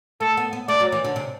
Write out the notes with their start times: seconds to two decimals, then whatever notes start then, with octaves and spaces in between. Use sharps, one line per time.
0.20 A3 A4
0.37 B3
0.53 B3
0.68 A3 D5
0.80 F#3
0.92 E3
1.04 D3
1.16 C3